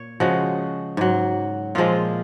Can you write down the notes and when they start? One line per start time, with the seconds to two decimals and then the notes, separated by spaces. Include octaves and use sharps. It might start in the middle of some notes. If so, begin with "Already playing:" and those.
Already playing: A#2 C#5
0.20 C#3 F3 G#3 F#4
0.97 G#2 F#3
1.75 A#2 F3 G#3 F4